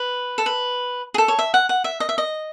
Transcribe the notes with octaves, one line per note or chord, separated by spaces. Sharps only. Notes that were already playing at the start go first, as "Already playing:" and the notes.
Already playing: B4
A4
B4
G#4
A4
C#5
E5
F#5
F#5
E5
D#5
E5
D#5